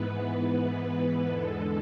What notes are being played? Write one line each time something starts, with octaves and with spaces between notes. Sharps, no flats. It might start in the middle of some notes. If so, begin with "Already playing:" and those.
Already playing: G#2 E3 B3 B4
G#2 E3 B3
E2 D3 G#3 A4